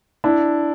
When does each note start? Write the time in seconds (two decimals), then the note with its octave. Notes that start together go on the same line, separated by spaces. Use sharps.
0.24 D4 E4